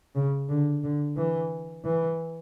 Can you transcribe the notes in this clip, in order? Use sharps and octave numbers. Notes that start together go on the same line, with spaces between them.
C#3
D3
D3
E3
E3